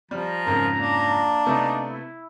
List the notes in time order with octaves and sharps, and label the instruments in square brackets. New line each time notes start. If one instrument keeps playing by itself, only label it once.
[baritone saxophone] F3 [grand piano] G3 [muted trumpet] A#5
[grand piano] F2 G#2 C#3 [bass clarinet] A#4
[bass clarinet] A#3 [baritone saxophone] D4
[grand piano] C3 A3 B3 [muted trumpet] D#4
[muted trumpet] E4